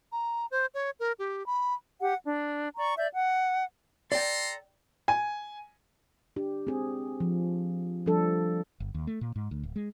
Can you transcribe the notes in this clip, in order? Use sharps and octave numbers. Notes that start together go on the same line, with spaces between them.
A#5
C5
C#5
A#4
G4
B5
G4 F#5
D4
D5 A#5 C#6
D5 E5 G6
F#5
A4 D5 G5 A#5 C6
G#5
D4 G4
C4 G#4
F3
F3 G3 D4 A4
G1
D#2
A3
A#2
G#2
D2
D1
G#3